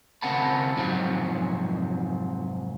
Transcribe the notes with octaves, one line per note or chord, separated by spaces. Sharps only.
C#3 C4 A#4 F#5 A5 B5
F2 G#2 C3 F3 F#3